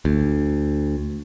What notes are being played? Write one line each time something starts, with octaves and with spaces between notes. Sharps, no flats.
D2